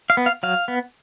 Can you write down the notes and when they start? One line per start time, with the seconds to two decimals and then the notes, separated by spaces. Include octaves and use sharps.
0.10 F5
0.17 B3
0.26 F5
0.43 F#3 F5
0.68 B3